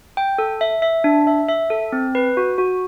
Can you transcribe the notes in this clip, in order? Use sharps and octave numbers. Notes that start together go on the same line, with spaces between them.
G5
A4
E5
E5
D4
E5
E5
A4
C4
B4
F#4
F#4